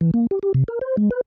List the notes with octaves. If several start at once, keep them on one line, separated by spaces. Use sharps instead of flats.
E3
A#3
G4
G4
C3
A#4
C5
G#3
B4